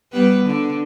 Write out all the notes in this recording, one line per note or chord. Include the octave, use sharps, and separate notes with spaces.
G3 B3 B4
D3